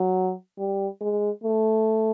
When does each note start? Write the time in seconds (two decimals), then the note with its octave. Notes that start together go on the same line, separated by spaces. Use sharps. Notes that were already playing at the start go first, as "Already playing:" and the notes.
Already playing: F#3
0.58 G3
1.01 G#3
1.44 A3